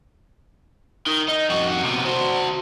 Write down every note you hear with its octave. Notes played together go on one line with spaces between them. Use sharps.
D#3
D#4
F2 F#4
C3 B3
F#4 C5